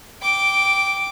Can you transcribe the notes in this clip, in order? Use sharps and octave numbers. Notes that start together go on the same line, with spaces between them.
G5 D6